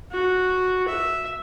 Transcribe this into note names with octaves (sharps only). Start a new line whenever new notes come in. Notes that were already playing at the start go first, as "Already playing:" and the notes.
F#4
E5